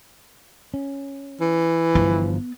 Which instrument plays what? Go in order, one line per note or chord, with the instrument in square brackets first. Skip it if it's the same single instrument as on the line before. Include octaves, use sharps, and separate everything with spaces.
[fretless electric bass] C#4
[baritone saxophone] E3
[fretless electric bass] G1 G2 F3 [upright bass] B3